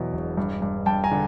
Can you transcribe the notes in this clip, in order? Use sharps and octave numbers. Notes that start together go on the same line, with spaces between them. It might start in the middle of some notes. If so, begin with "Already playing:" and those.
Already playing: E2 B2 F#3
E1
G2
G2
G2 G5 A5
G#5 A#5
D3